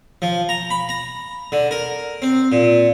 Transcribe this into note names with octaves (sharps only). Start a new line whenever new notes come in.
F3
A#5
B5
A#5
D3
A#4
C4
A#2